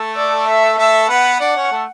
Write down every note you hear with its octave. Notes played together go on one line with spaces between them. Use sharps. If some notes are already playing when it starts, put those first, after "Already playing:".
Already playing: A3 A4
D5
E5
A3 A4 E5
B3 B4 F#5
D4 D5 F#5
C#4 C#5
A3 A4